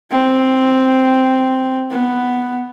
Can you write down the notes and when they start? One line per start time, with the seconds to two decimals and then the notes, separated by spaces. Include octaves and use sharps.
0.11 C4
1.91 B3